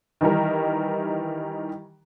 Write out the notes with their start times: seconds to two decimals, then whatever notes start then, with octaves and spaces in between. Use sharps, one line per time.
0.21 D#3 E3 G3 A#4